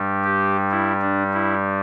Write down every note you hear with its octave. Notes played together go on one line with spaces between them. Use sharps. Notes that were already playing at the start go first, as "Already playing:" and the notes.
Already playing: G2 G3
G4
E4
D4
E4